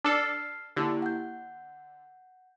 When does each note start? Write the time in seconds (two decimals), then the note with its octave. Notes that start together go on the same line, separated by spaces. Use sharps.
0.04 D4 A4 F6 C7
0.76 D3 A#3 E4 G4
1.02 F#5 G6